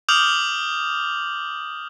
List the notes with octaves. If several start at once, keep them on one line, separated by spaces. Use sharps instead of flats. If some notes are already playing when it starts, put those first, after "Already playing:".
D6 D#6 F6 G6 F7 F#7